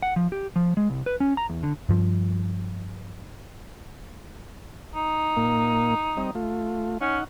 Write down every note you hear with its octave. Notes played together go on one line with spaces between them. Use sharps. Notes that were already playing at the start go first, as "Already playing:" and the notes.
F#5
F3
G4
F3
G#3
C2
B4
C#4
A#5
E2
D3
G2 F3
D#4
A#2 A#3
G3 C4 D#5
A3 F4
C#4 D#4 F#5